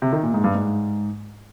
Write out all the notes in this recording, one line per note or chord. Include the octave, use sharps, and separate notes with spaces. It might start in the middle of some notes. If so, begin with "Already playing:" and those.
C3
D#3
A#2
G#2
G2
G#2